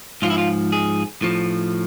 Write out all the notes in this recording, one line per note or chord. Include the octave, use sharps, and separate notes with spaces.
G#2 F3 F4
E4
F4
G#4
A2 F3